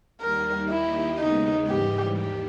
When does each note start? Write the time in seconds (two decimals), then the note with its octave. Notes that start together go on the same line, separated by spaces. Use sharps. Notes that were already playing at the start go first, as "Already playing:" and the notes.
0.21 D#2 D#3 G3 A#3 A#4
0.70 D#2 D#3 A#3 D#4 E4 G4
1.18 D#2 C#3 G#3 B3 D#4
1.68 G#2 E3 G3 G4
2.17 D#2 D#3 G4